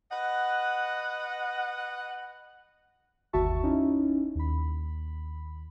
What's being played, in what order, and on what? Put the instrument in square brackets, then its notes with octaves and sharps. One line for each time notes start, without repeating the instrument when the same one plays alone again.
[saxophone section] B4 D#5 F#5
[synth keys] G1 D#2 F#4 E5 A5 C#6
C#4 D#4 E4
D#2 B5